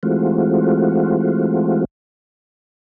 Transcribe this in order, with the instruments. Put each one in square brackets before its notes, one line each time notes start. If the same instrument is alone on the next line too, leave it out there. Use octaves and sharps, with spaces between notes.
[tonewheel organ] E3 G#3 A3 C4 F4 F#4